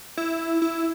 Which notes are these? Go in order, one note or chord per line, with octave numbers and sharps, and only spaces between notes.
E4
E4